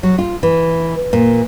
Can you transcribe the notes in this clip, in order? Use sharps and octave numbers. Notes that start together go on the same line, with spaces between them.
F#3
F4
E3
A#2